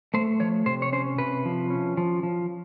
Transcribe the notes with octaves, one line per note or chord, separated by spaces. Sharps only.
A3 C5
F3 C#5
C3 C5
C#5
C#4 C5
C3 B4
F3
C#4
F3
F3